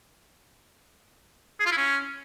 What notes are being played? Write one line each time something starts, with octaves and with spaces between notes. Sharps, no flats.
G#4
F4
E4
C#4